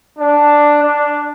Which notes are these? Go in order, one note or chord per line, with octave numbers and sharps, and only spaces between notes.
D4
D4